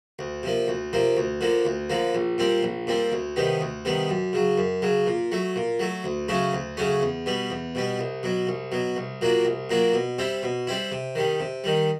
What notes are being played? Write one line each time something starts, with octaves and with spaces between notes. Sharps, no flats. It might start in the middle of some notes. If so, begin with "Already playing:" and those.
D2
C3 F3 A#3
D2
C3 F3 A#3
D2
D3 F3 A#3
D2
D3 F3 A#3
A#1
A#2 G3 C4
A#1
A#2 G3 C4
D2
C3 D#3 G3 B3
D2
C3 D#3 G3 B3
F#2
C#3 F#3
F#2
C#3 F#3
A#2
F#3 A3
A#2
F#3 A3
D2
C#3 F#3 A3 C#4
D2
C#3 F#3 A3 C#4
E2
B2 G3 B3
E2
B2 G3 B3
C2
B2 F#3
C2
B2 F#3
C2
A#2 F#3 A#3 D4
C2
A#2 F#3 A#3 D4
B2
G3 C4 E4
B2
G3 C4 E4
C3
D#3 G3
C3
D#3 G3